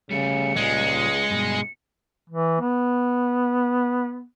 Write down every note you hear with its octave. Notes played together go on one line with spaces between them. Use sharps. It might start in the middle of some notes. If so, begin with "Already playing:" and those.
C#3 G3 A3 C#7
C#2 A#2 G3 G#3
G2 B2
E3
B3